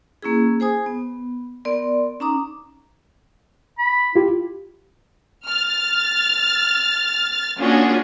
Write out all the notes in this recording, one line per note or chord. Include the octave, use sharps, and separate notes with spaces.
A#3 C#4 E4 G#4
G#4 C5 G#5 D#6
B3
B3 A#4 D5 C6
C#4 D#4 A#5 D6 D#6
B5
E4 F4 G4
F6 A6
A#3 C#4 D4 F4 F#4 G#4